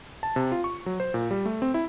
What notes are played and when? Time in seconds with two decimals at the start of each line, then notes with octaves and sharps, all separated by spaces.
0.23 A5
0.36 C3
0.52 F4
0.64 C#6
0.86 F#3
1.00 C5
1.14 A#2
1.31 G3
1.45 A3
1.62 C4
1.74 E4